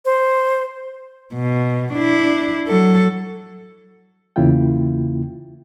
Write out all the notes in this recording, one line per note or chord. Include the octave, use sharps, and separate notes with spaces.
C5
B2
D4 E4
F#3 A4
E2 C#3 A#3 E4 F4 G5